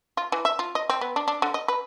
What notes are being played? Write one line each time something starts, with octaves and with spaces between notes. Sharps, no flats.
F4
E3
E5
F4
D#5
C4
B3
D4
D4
D3
D#5
B4